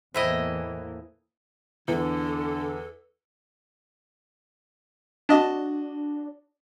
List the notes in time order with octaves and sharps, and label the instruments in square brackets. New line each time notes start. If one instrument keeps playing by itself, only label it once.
[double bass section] E2 E3 A#3 [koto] A2 E4 D#5 [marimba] C5
[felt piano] E2 [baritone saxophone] D3 [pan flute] A4
[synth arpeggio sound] D4 [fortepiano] F#4 D#5 A5